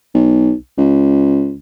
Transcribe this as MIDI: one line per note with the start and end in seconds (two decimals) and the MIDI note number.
0.14 0.52 35
0.78 1.55 37